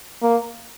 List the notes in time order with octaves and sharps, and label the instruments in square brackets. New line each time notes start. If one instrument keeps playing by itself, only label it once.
[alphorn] A#3